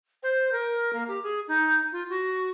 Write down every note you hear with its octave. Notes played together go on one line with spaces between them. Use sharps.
C5
A#4
A#3
G4
G#4
D#4
F4
F#4